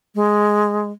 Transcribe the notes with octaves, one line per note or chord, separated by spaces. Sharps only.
G#3